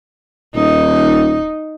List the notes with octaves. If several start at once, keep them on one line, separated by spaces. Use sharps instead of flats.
D#1 D#4